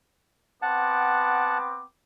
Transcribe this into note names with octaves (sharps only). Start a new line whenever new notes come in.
B3 C4 F#5 A5 D6